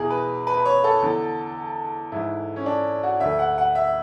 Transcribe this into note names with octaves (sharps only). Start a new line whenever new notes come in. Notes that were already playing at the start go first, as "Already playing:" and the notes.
Already playing: E2 B2 G#4
B4
B4
B4
C#5
A4
E2 D3
G#2 E3 E4
C#4
D4
F#4
D2 D3 E5
F#5
F#5
E5